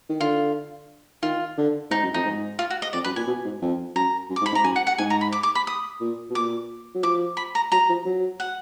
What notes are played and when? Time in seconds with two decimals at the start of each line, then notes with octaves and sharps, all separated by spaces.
0.09 D#3
0.20 D3 F4
1.23 D#3 F4
1.57 D3
1.90 G#2 D#4
2.03 F#2
2.14 F2 D#4
2.25 G#2
2.59 F4
2.70 F#4
2.82 D#5
2.93 F2 D5
3.04 F#2 B4
3.16 A#2 G#5
3.27 B2
3.45 G#2
3.62 F2
3.95 F#2 A#5
4.30 F#2
4.36 D6
4.41 G#2
4.46 B5
4.52 G#2
4.55 A#5
4.64 F#2 G#5
4.76 F#5
4.87 F#5
4.98 G#2 G#5
5.10 A#5
5.21 B5
5.32 D6
5.43 D6
5.55 B5
5.67 D#6
6.01 A#2
6.30 B2
6.35 A#2 D6
6.94 F#3
7.03 F3 D6
7.37 B5
7.55 A#5
7.72 F#3 A#5
7.89 F3
8.05 F#3
8.40 F#5